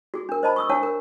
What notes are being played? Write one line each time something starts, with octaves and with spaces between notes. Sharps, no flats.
F#4 G#4
D4 A#4
C5 D#5 A5 B5
C#6 D#6 E6
D4 C#5 F#5 A5
A#4